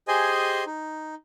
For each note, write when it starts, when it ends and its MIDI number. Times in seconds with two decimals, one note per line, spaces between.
0.08 0.64 67
0.08 0.64 68
0.08 0.64 72
0.08 0.64 75
0.08 0.64 80
0.67 1.15 63